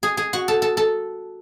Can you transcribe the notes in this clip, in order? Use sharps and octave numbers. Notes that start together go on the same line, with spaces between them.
G#4
G#4
F#4
A4
A4
A4